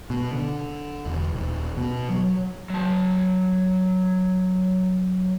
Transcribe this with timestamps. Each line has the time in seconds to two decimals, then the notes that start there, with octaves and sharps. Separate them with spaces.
0.10 B2
0.32 D3
1.06 E1
1.34 D#1
1.77 B2
2.10 F#3
2.70 F#3 A5